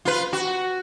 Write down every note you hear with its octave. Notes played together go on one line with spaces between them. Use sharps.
F4 B4
F#4